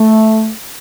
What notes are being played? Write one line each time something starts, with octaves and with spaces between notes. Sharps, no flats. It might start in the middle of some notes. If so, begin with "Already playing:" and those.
Already playing: A3